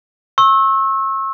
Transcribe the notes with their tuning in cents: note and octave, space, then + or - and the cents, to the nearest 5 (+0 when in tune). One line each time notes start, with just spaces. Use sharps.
C#6 -40 E6 -15